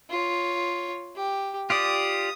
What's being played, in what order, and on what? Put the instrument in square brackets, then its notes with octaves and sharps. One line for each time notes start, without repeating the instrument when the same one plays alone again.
[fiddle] F4 C#5
G4
[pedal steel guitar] F4 G4 D5 [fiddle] D#6